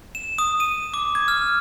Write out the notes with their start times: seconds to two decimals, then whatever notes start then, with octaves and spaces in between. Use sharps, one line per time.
0.15 E7
0.38 D#6
0.60 D#7
0.94 D6
1.15 G#6
1.28 F6